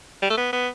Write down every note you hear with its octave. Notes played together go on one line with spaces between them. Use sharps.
G3
A3
B3
B3